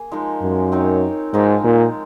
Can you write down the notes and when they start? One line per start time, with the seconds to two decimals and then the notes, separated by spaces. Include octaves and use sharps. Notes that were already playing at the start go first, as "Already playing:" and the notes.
Already playing: A#3 G#4
0.11 F3 G#3 D#4 A#4
0.42 F#2
0.72 C4 D#4 A#4 C#5
1.33 G#2 F3 G#3 D#4 A#4
1.64 A#2